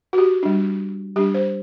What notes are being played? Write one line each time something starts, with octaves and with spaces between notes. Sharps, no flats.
F#4
G4
G3 D4
G3 D4 G4
C5